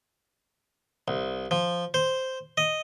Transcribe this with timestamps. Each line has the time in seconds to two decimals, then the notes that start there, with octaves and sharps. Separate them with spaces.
1.08 C2
1.51 F3
1.94 C5
2.57 D#5